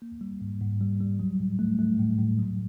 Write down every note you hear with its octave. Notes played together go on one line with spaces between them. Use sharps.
A#3
G3
G#2
G#2
G3
G3
F#3
A2
A3
A3
A2
A2
F#3